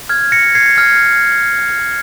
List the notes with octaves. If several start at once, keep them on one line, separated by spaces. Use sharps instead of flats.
F6 G#6
A#6 C#7
G#6 C7
F6 G#6